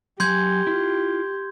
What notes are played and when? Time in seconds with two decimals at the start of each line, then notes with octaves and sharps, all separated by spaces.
0.20 F#3 G4 G#5 C6 G6 G#6
0.67 E4 F4